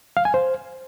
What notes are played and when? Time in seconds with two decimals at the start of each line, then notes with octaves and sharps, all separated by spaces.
0.17 F5
0.25 G#5
0.34 C5